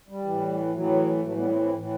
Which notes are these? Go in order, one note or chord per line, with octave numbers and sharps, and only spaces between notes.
G3
A2 E3
A2 E3 F#3
A2 E3 F#3 A3
G3 B3
A3 C4
C4 E4
A2 E3